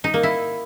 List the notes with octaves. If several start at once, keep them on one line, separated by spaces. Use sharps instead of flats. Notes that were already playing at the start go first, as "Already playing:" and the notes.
D#4
A#3
E4